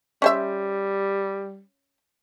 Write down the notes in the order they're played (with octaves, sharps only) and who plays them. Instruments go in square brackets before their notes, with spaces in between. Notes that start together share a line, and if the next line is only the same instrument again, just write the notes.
[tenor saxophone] G3 [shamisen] C#4 C5 E5